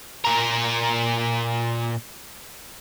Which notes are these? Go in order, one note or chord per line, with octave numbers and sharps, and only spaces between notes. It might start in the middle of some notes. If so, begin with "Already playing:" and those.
A#2 A#4